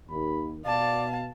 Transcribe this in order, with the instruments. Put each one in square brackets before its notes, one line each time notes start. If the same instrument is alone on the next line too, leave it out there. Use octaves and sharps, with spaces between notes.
[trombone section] D#2 [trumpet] B5
[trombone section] B2 [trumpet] D5 [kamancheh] F5 A5